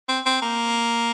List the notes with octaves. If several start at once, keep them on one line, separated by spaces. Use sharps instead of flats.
C4
C4
A#3